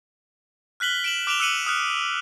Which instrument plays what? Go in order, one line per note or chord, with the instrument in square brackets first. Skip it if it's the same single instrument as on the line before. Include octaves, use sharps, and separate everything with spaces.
[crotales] F6 F#6 B6 F#7 G7
D7 E7 F#7
D6 F#6 D7 E7 F7 G7
E6 F#6 C#7 D#7 F#7
D#6 F6 F#6 C#7